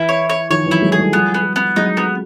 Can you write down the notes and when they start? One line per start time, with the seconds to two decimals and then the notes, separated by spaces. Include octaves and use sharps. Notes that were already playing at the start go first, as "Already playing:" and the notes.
Already playing: E3 E4
0.09 C#5
0.29 C#5
0.50 D#3 F3 C#5
0.66 E3 F#3
0.71 E4
0.82 F#3 G#3
0.92 G#4
0.98 G3 A3
1.13 F3 G3 B3
1.34 B3
1.56 B3
1.76 F#3 G#3 D#4
1.97 B3